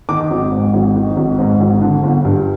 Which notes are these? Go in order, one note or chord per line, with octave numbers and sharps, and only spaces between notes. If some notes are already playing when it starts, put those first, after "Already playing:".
D#3 D6
G#1
G#2
G#1
D#3
G#1
G#2
G#1
D3
G1
G2